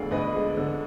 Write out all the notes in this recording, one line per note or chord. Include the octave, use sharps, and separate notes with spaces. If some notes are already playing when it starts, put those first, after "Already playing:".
Already playing: D2 D3 G#3 D5 F5
D2 B4 D#5
G#3
D3